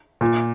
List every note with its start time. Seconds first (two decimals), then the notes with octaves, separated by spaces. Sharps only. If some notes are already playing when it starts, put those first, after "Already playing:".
0.21 A#2